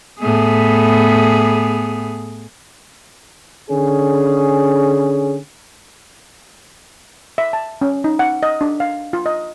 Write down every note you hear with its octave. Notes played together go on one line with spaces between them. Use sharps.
A2 B3 G#4
D3 C#4 G#4
E5
A5
C#4
D#4
F#5
D#5
D4
F5
F4
D#5